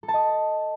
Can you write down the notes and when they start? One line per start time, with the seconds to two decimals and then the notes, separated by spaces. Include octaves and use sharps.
0.03 A4
0.08 A5
0.14 D#5